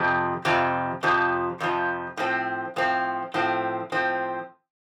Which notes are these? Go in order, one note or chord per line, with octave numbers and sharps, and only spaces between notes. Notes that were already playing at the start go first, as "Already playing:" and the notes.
Already playing: F2 C3 F3
F2 C3 F3
F2 C3 F3
F2 C3 F3
A2 F3 C4
A2 F3 C4
A2 F3 C4
A2 F3 C4